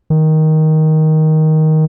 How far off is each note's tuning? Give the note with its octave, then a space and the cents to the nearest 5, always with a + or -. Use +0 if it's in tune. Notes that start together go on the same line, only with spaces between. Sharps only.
D#3 +10